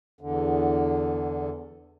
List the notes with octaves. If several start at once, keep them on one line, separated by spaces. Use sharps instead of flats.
E2 D3